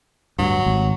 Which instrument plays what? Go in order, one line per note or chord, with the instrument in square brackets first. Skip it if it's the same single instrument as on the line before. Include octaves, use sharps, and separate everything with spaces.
[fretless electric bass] D1 G2 [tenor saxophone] F#3
[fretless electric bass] G#1